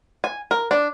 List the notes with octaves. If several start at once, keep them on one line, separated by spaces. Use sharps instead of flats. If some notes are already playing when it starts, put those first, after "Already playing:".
G#5
A#4
D4